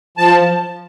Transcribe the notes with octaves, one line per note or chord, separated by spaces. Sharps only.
F3 A5